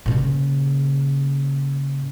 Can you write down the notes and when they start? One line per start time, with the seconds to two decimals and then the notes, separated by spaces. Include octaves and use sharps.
0.06 A#2 C#3